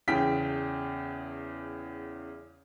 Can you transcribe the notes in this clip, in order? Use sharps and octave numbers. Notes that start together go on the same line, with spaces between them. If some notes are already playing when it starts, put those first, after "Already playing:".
E2 C#3 G5 B6